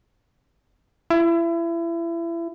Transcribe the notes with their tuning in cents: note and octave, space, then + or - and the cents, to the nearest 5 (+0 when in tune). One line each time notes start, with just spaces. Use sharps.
E4 +30